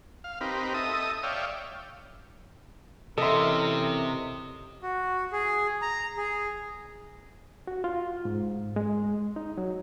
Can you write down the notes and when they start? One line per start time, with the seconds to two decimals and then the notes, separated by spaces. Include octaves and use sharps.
0.24 F5
0.41 C4 D#4 G4 A#4 B4
0.74 A4 D#5 E5 D#6
1.23 C#5 D5 E5 F5 G5
3.18 C3 E3 C#4 A4 A#4 D#5 E5 C6
4.82 F#4
5.32 G#4
5.82 A#5
6.17 G#4
7.67 F#4
7.84 F4
8.25 G#2
8.76 G#3
9.36 D#4
9.58 F#3